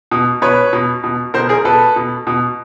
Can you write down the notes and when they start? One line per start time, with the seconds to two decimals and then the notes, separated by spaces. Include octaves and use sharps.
0.11 B2
0.42 B2 B4 C#5
0.73 B2
1.04 B2
1.34 B2 A#4 C5
1.49 G#4 A#4
1.65 B2 A4 B4
1.96 B2
2.27 B2